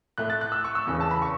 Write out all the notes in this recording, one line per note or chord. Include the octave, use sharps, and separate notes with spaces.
A2 A3 F#6
A6
F#6
E6
C#6
E6
E2 C#3 E3
A5
B5
C#6